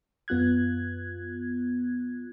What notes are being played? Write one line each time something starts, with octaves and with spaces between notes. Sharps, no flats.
F#2 B3 F4 F#6 G#6